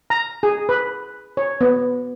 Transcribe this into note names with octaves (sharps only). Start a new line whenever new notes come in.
A#5
G#4
B4
C#5
B3